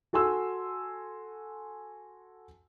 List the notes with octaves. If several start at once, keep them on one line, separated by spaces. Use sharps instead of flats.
F#4 A4 G#5 C6 E6